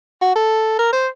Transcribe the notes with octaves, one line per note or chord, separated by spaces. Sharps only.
F#4
A4
A#4
C5